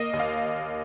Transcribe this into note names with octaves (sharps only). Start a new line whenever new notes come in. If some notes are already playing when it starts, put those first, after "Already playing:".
Already playing: A#3 D#5
D#2
F5